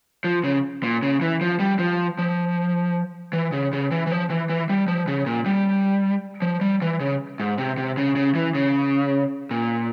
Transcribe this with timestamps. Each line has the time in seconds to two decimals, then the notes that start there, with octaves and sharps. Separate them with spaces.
0.24 F3
0.44 C#3
0.83 A#2
1.02 C#3
1.21 E3
1.41 F3
1.59 G3
1.79 F3
2.18 F3
3.33 E3
3.52 C#3
3.73 C#3
3.91 E3
4.07 E3
4.12 F3
4.30 E3
4.49 E3
4.69 G3
4.88 F3
5.08 C#3
5.26 A#2
5.46 G3
6.42 F3
6.61 G3
6.82 E3
7.00 C#3
7.40 G#2
7.58 C3
7.77 C3
7.97 C#3
8.16 C#3
8.35 E3
8.54 C#3
9.51 A#2